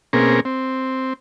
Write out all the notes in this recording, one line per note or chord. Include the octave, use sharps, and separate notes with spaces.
B2 A#3 C4 C#4 G#4 A#4
C4